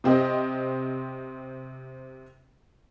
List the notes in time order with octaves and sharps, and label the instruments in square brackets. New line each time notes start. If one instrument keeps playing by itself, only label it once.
[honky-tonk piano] C3 C4 G4 D#5